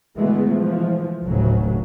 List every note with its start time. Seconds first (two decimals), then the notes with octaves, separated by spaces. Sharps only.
0.18 B2 D3 E3 G#3 A3 B3
0.50 E3 F3
1.25 F1 D2 A2 C#3 F#3